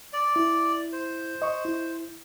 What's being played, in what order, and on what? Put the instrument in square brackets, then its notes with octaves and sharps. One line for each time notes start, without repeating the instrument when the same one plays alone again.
[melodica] D5
[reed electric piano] E4
[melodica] C5
[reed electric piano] D#5 C#6
E4